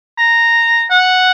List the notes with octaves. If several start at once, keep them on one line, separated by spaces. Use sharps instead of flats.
A#5
F#5